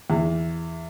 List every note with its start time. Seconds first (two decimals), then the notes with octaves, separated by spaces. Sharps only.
0.10 E2